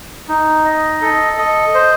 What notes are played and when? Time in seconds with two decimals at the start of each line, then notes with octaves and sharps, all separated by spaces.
0.29 D#4
0.65 D#5
1.02 A4
1.38 D#5
1.74 C5